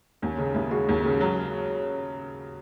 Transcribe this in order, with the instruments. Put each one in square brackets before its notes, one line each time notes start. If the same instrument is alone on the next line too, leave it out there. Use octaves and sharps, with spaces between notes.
[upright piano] D#2 [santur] C#4
[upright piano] C#3 [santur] D#4
[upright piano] D#2 [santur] E4
[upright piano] G#3 [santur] F#4
[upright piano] D#2
C#3
F#3